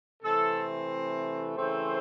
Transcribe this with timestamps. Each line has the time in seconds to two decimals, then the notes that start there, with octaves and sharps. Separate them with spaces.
0.21 C3 E3 A3 C4 A4
1.56 C#3 E3 A3 C4 C5